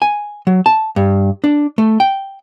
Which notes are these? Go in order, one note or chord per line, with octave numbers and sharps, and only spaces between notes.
G#5
F#3
A5
G2
D4
A3
G5